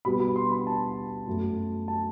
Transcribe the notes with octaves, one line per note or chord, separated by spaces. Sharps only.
B2 G3 B3 B5
B5
C6
B5
A5
F#2 F#3 A3
A5